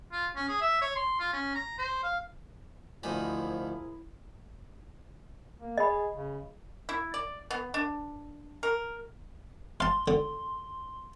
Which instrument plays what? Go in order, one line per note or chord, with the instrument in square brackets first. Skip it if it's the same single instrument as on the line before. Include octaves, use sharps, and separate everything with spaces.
[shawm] F4
C#4
G#4
E5
C#5
C6
F4
C#4
A#5
C5
F5
[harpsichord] D2 D#3 B5 [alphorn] F3 [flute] E4 [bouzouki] G#4 A#4 C5
[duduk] A#3
[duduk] G#4 [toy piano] D#5 B5
[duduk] C#3
[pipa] E4
D5
B3
D4
A#4
[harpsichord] F5 A5 [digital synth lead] C6
[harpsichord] D3